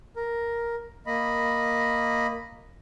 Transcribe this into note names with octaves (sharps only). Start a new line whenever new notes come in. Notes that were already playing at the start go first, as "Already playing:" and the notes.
A#4
A#3 D#5 B5